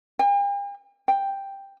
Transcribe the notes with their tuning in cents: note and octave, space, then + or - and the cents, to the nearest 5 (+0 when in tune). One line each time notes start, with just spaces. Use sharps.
G5 +45
G5 +5